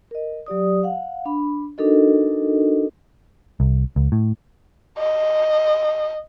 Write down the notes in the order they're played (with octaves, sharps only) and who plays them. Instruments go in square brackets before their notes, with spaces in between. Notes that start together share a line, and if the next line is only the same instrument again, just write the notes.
[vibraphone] A#4 D#5
F#3 G4 D5 D#6
F5 F#5
D4 B5
D4 D#4 F#4 A4 A#4 D#5
[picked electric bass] C2
C#2
A2
[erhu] D#5